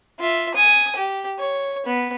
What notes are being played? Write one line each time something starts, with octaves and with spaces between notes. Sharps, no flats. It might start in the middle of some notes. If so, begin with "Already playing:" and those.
F4 E5
G#5 D#6
G4
C#5
B3